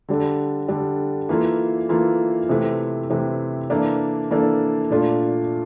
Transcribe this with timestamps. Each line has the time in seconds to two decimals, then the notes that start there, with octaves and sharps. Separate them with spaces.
0.08 D3 G3 D4 A4
0.68 D3 G3 D4 A4
1.29 E3 A#3 F4 A4
1.89 E3 A#3 F4 A4
2.49 C3 E3 A3 C4
3.10 C3 E3 A3 C4
3.70 E3 A#3 D4 A4
4.31 E3 A#3 D4 A4
4.90 A#2 A3 D4 F4